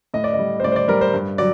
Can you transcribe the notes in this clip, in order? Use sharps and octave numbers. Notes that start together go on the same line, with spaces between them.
A2 D#5
D5
D#5
G3
C5
A2 D5
C5
D5
G3 A#4
C5
G2
F#3 D5